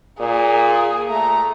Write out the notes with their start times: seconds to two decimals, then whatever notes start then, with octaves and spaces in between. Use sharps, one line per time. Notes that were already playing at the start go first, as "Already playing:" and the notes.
0.20 A#2 G#4
1.10 A3 A#5